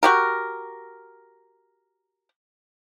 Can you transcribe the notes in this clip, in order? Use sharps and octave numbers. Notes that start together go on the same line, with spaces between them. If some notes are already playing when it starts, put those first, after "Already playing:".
F#4 G4 A#4